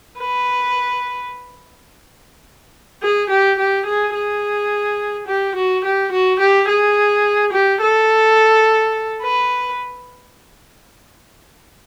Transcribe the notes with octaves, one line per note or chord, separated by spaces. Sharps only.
B4
G#4
G4
G4
G#4
G#4
G4
F#4
G4
F#4
G4
G#4
G4
A4
B4